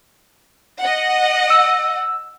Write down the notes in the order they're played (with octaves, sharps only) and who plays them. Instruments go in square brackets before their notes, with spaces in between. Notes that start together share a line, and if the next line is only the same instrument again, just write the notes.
[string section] D#5 F#5
[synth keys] E6